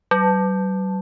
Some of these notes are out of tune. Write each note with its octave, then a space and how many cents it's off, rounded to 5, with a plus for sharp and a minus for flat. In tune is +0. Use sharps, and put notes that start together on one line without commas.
F#3 +45